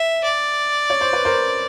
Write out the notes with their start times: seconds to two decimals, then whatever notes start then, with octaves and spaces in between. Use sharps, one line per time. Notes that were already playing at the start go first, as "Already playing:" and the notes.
Already playing: E5
0.24 D5
0.90 C#5
1.01 C5
1.13 B4
1.25 A#4 C5